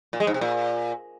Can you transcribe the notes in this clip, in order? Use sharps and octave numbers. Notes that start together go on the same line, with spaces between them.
A#2
G#3
G#2
C3
A#2